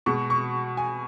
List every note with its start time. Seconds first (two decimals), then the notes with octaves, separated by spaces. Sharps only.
0.06 B2 G#3 C#6
0.30 C#6
0.77 G#5